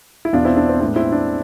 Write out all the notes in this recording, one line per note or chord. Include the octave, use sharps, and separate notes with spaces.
E4
E2 B2 B3 D4 F4
C4 E4
D4
C4
A2 G#3 B3 D4
C4 E4
D4